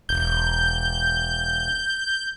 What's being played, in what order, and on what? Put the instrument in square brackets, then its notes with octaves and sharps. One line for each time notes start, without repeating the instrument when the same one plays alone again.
[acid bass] E1 [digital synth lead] G6